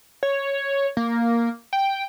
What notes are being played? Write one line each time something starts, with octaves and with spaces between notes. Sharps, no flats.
C#5
A#3
G5